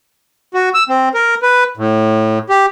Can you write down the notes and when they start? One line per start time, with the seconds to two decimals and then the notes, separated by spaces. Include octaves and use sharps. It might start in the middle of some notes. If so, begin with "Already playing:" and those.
0.54 F#4
0.74 E6
0.89 C4
1.14 A#4
1.42 B4
1.77 A2
2.50 G4